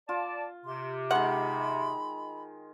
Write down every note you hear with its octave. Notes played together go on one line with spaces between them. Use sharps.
F4 D5 A5
C3 C6
D#3 G#3 F#5 B5